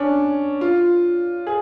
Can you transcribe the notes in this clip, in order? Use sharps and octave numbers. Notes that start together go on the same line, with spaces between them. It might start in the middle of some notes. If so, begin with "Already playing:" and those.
Already playing: C#4 D4
F4
G#4